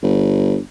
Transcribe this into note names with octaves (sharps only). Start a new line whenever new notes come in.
G1